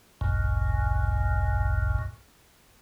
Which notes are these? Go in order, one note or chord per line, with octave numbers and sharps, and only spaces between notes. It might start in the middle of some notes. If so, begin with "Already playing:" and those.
G#1 C#2 F#2 A#2